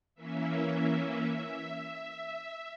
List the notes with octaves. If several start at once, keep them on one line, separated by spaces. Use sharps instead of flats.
E3 A#3 C#4 E5